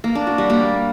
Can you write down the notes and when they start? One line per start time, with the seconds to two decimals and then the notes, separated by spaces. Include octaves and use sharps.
0.04 A#3
0.15 D4
0.27 F#4
0.38 G3
0.50 A#3